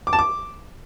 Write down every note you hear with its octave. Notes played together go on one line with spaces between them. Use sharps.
D6
A5
D6